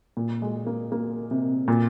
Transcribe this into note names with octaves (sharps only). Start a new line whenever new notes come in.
A#2
G#3
A#3
A#3
C3
A#2